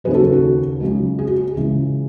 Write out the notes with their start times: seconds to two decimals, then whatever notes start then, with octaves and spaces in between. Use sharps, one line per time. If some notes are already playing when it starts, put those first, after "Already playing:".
0.04 D#2 C#3 F#3 G#4 B4
0.14 F#4 A4
0.33 F#4
0.81 C#2 C#3 F#3
1.19 G#4
1.28 F#4
1.38 G#4
1.57 C#2 C#3 E3